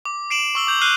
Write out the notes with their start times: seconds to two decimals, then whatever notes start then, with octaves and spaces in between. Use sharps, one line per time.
0.05 D6
0.30 C7 D7 E7 F#7
0.55 C#6 E6 F#7
0.67 D6 G6 F7 F#7
0.82 F6 F#6 C7 D#7 G7